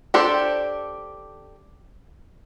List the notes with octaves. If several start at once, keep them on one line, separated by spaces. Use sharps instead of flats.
D4 G4 A4 C5